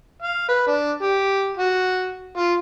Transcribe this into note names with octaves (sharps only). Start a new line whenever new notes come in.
F5
B4
D4
G4
F#4
F4